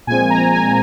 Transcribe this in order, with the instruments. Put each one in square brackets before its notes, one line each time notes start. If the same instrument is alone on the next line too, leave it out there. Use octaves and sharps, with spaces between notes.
[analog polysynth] A#2 F3 G#3 C4 G#5
A#5
G#5